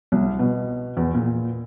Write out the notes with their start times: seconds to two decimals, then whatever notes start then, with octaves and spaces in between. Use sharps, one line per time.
0.12 C2
0.39 B2
0.97 E2
1.15 A#2